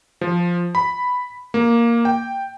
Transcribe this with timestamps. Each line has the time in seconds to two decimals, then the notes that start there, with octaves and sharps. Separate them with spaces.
0.21 F3
0.75 B5
1.54 A#3
2.05 G5